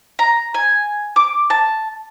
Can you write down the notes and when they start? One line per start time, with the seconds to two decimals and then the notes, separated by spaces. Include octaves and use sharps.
0.19 A#5
0.54 G#5
1.16 D6
1.50 A5